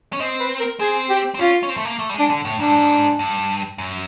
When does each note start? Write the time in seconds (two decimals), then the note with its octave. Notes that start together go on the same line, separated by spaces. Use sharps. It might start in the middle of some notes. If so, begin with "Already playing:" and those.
0.13 C#4
0.20 C4 D#5
0.40 B4
0.60 A#4
0.79 C4 G#4
1.10 G4
1.34 C4
1.39 C#4 F4
1.63 C#4
1.69 C4
1.77 A3
1.85 A#3
1.99 A3
2.09 G3
2.14 G#3
2.19 D4
2.30 D3
2.45 A2
2.59 G#2 D4
2.68 G2
2.76 G#2
3.19 G2
3.78 F#2